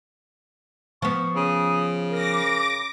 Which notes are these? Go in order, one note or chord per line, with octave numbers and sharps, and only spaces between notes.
F3 B3 C#6
C#3 D#6
A#4 D6 A#6